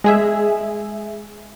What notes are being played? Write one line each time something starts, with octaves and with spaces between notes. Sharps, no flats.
G#3 G#4 E5